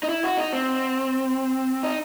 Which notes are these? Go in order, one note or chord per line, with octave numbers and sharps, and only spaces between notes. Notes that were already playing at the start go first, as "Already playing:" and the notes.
D#4
E4
F#4
D#4
C4
D#4